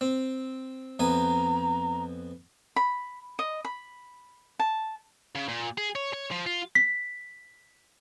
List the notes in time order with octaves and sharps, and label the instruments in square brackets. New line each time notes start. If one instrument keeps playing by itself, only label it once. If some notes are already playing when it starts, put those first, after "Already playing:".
[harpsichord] C4
[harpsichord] F2 B3 G#5 [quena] A#5
[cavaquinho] B5
D#5
B5
A5
[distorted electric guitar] C#3
A#2
G#4
C#5
C#5
F3
F4
[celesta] B6